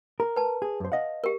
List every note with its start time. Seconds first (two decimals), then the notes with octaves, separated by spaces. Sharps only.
0.20 A#4
0.36 B4 A5
0.62 G#4
0.80 F#2 C5
0.92 D#5 F5 F#5
1.24 G4 A#4